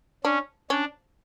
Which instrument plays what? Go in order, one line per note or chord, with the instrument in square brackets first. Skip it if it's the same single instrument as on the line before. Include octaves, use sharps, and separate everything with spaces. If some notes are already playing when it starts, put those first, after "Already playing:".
[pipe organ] C#4 [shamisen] D4
[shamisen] C#4 [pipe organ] D4